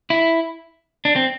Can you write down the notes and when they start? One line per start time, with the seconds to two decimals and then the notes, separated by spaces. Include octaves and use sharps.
0.10 E4
1.05 D4
1.16 C4